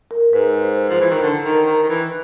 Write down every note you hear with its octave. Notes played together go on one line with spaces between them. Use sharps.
A#4
G#2 B4
C5
F3 C5
E3
D#3
D3
D#3
D#3
D#3
E3